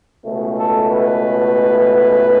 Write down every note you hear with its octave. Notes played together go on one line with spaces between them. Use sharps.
C#2 B2 A3
A4
B4